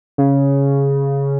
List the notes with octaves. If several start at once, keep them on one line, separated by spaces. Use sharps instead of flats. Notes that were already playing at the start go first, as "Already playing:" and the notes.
C#3